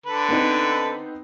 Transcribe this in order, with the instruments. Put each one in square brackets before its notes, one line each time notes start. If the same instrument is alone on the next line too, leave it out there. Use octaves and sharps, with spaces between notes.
[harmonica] D3 A4 B4
[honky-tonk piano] B3 C4 D#4